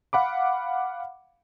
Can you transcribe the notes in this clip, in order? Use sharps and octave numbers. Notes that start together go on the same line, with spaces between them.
F5 F#5 B5 D6